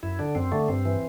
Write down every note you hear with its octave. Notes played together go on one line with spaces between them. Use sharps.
F#2 E4
D3 D4
F#2 C4
D3 A3
G2 C4
E3